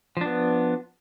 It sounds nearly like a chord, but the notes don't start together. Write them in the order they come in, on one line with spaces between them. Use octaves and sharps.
F3 D4 B3